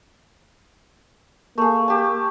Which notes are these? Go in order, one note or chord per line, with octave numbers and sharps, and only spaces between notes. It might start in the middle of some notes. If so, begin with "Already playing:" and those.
A3 A#3 G#4
G4 A5